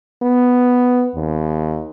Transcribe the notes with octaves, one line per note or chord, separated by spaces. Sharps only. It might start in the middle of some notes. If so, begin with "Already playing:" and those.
B3
D#2